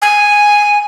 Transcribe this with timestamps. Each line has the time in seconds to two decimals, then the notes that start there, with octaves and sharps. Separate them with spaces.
0.02 G#5